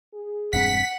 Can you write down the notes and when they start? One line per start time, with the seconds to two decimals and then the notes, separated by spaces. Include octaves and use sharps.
0.12 G#4
0.53 E1 G2 C4 F#5 B6